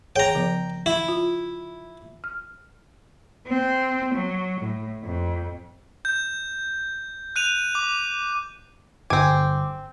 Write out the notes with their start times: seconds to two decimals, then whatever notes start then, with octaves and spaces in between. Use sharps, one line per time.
0.16 G#4 C#5 G5 A#5
0.35 C#3 F3 B3
0.86 E4
1.09 F4
2.24 F6
3.47 C4
4.14 F#3
4.60 A2
5.04 F2
6.05 G6
7.36 F#6 D#7 F7
7.75 D6
9.10 G1 C4 G#5 D6